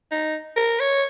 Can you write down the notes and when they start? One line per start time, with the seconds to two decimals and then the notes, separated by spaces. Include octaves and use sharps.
0.11 D#4
0.57 A#4
0.80 C#5